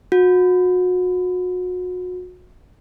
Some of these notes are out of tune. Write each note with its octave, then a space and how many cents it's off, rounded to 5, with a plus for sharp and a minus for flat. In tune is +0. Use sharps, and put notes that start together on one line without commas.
F#4 -30